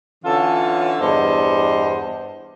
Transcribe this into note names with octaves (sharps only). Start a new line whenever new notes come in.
D3 E3 C#4 F4 A4
E2 G2 D4 C5 D#5